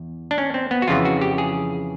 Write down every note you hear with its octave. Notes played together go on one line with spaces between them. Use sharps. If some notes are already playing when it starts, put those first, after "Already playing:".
Already playing: E2
D4
C#4
C4
B3
F#4
F2 C#3 E3 F4
F#4
G4
G#4